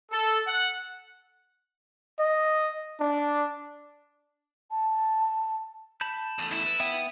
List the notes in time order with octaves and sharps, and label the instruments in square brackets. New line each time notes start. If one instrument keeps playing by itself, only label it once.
[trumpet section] A4
F#5
[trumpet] D#5
D4
[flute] A5
[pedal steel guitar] A5 B5 G6
[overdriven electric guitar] E2 A3
[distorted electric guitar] E4
[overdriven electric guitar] B4
[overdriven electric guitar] B3 [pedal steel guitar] E5 F#5 G5